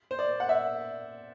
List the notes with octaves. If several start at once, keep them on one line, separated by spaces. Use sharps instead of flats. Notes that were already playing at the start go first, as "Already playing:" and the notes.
C5
D5
F#5
E5